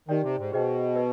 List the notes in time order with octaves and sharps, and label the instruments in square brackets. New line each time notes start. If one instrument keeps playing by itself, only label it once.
[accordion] D#3 [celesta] D#4 G4 D5 G5
[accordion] C3
G#2
[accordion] B2 [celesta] G#4 C5 D#5 G5
[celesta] B4 D#5